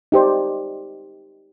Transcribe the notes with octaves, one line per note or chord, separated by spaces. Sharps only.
D#4 G4 C5 D5